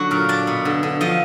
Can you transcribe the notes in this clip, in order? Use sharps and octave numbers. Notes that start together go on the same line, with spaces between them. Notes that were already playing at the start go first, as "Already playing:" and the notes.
Already playing: D3 F#3 F#4
A#2 A#4
D4 D5
B2
D3
D3
F3 D#5